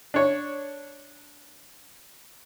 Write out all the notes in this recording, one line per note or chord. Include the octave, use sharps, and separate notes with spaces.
D4 C#5